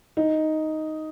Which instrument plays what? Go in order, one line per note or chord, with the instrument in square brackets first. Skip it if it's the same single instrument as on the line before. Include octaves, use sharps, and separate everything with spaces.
[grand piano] D#4